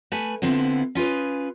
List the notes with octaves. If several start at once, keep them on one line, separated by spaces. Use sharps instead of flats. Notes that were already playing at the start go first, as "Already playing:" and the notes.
A3 B4 G#5
D3 B3 C4 E4 F4
C#4 F4 G#4 B4